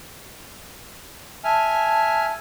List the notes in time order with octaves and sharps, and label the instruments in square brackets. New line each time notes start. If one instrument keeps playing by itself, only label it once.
[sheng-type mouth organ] E5 G#5 F6 [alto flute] A5